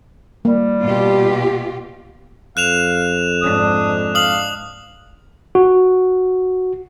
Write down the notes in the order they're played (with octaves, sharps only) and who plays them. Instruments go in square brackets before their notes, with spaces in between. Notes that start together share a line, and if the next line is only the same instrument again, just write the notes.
[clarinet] G3 [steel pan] A#3
[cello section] B2 F4 G4
[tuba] F2 [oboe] F5 [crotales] F#6 E7 F7
[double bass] G#2 D4 [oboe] D#6
[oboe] F5 [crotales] D#6 F#7
[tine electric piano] F#4